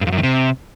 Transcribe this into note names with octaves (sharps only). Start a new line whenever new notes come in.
G2
F2
F#2
D#3
C3